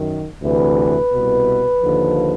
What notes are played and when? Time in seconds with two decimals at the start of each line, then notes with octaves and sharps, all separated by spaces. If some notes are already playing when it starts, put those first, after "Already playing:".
Already playing: F#2 D#3
0.42 D2 C3 E3 B4
1.12 C2 B2
1.83 D#2 D3 F3